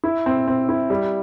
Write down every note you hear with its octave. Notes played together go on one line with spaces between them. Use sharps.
E4
C4
C4
E4
G3